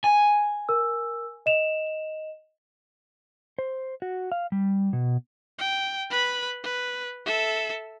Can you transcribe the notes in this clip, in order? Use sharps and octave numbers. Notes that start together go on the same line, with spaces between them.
G#5
A#4 E6
D#5 E7 F7
C5
F#4
F5
G3
B2
G5
B4 B5
B4
A4 E5